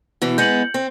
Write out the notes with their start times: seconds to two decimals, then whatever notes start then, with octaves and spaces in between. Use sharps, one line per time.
0.22 B2 E3
0.38 G#3 B3 G6 C#7 F#7
0.74 C4